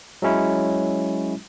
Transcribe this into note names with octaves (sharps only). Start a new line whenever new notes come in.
F#3 G#3 C#4 E4